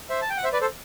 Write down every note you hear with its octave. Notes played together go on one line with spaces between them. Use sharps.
C5 E5
A5
G5
F#5
C5 E5
B4 D5
A4 C5